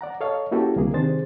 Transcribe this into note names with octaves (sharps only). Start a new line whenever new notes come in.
D5 F#5 A#5
A4 C#5 D#5 F5
A#3 C#4 E4 F#4 G4 A4
C2 D3 A#3 G#4
C3 D#3 D4 G#4 C5 A6